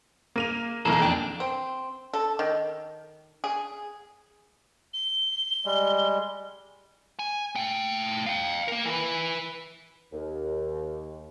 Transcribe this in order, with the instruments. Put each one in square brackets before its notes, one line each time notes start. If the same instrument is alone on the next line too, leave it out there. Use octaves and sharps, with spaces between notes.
[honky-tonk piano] A#3 D#7 F7
[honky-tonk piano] B1 A#3 A#5 [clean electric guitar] E3 G#4 A4
[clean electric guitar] F2 D4 [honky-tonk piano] G5
[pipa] C4
A4
D#3
G#4
[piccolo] G7
[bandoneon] G3 G#3
[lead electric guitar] G#5
A3 G5
F5 G5
A#3 A#4
E3 B4
[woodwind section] D#2